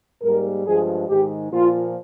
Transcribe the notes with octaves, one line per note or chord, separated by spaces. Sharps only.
G#2 G3 A#3 A#4
G2 F3 G#3 G#4
G#2 D#3 G#3 G4
A#2 F3 A#3 F4